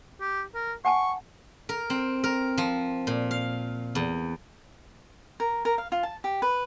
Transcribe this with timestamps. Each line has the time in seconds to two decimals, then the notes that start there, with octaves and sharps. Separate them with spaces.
0.21 G4
0.55 A#4
0.85 F#5 G#5 A5 C#6
1.69 A#4
1.90 C4
2.24 A#4
2.58 F3
3.07 A#2
3.31 F5
3.95 E2
5.40 A#4
5.65 A#4
5.78 F5
5.92 F4
6.03 A5
6.24 G4
6.42 B4